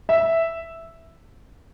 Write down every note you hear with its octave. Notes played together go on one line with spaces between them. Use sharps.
E5